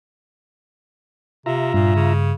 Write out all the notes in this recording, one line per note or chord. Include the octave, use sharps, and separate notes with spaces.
C3 F4 E5 A#5
G2 A#2
C#3